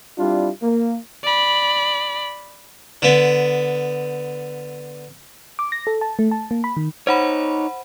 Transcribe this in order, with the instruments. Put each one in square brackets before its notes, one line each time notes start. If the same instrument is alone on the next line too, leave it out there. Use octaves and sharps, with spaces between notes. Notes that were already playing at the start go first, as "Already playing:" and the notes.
[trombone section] G3 C4 D4 E4 F4
A#3
[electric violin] D5 B5
[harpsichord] D3 B3
[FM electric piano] D6
A#6
A4
A5
A3
A5
A#3
B5
D#3
[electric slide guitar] D#4 C#5 [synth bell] C5 F#5 B5